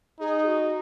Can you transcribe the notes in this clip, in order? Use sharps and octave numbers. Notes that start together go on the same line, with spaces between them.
D#4 G#4
F#4